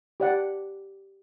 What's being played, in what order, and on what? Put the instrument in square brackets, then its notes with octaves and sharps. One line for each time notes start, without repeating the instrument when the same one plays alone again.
[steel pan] G4 D5 F#5